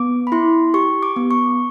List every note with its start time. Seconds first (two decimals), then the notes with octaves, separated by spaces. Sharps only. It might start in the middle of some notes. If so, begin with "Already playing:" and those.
Already playing: B3 D6
0.27 B5
0.32 E4 C6
0.74 G4 C#6
1.03 D6
1.16 B3
1.31 C#6